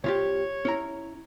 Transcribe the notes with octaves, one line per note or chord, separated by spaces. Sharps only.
C2 F4 G4 C#5
C#4 E4 A#5